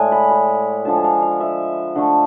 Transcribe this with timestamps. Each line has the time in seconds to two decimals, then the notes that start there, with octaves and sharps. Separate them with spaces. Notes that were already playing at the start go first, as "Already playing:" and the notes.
Already playing: A2 G#3 D5 G#5
0.12 B5
0.30 B5
0.85 D3 F3 G#3 A5
0.97 G#5
1.04 F5
1.22 F5
1.40 E5
1.95 D3 A3